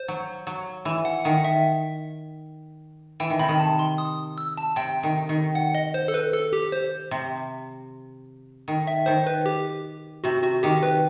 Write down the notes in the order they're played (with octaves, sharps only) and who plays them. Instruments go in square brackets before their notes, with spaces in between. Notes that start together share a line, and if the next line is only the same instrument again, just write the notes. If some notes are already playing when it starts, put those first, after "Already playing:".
Already playing: [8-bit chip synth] C5
[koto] F#3
F#3
E3
[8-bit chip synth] F#5
[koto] D#3 [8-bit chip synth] F#5
[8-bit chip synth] E5
[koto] E3 [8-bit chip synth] G5
[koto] D#3
[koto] C3 [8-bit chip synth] B5
[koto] D#3
[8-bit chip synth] A5
C6
D#6
E6
A5
[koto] C3 [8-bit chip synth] G5
[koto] D#3
D#3
[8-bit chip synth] F#5
D#5
C5
A4
B4
A4
G4
C5
[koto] C3
D#3
[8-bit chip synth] E5
[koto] D#3 [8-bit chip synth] C5
[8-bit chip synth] B4
G4
[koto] C3 [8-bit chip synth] F#4
[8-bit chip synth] F#4
[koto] D#3 [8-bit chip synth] G4
[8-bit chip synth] B4